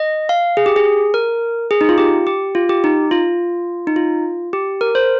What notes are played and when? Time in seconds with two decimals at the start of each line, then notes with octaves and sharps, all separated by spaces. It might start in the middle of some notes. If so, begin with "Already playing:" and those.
Already playing: D#5
0.29 F5
0.57 G#4
0.66 G4
0.76 G#4
1.14 A#4
1.71 G#4
1.81 D#4
1.89 F4
1.98 G4
2.27 G4
2.55 F4
2.69 G4
2.84 D#4
3.11 F4
3.87 D#4
3.96 F4
4.53 G4
4.81 A#4
4.95 C5